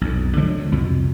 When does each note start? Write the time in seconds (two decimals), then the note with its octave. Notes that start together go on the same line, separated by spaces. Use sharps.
0.01 B1 F2
0.37 D3 F3 F#3 G#3
0.57 D2
0.72 C2 F2 B2